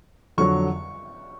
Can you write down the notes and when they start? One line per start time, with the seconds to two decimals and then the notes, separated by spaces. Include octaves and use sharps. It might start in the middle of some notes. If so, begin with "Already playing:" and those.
0.38 F2 D3 F#3 C#6